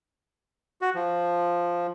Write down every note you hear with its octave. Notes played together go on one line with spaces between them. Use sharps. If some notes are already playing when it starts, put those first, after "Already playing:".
F#4
F3